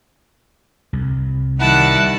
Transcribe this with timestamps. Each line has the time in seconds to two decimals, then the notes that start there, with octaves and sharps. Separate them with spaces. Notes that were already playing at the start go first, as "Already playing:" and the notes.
0.93 C2
1.60 D#3 G3 E4 F#5 A5